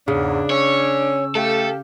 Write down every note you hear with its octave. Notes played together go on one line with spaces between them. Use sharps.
E2 G#2 C#3 D4
C#4 C#5 E6
A3 G4 A4 F5 G5